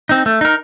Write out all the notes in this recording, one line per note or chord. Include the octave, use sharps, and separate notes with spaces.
C4 D#4
A3
D#4 A#4